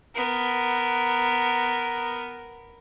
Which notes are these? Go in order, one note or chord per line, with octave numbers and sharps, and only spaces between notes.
B3 A#4